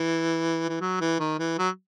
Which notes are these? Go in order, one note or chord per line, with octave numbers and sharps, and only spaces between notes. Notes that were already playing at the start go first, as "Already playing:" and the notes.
Already playing: E3
E3
F#3
E3
D#3
E3
F#3